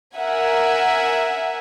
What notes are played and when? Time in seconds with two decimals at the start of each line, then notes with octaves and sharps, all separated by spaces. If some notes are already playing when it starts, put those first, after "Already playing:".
0.16 A#4 E5 F#5 G#5